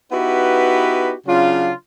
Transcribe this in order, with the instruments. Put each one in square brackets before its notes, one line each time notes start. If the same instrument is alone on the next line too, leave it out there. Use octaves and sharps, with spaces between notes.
[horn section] B3 D#4 E4 F#4 G4 B4
C#3 F#3 D4 F4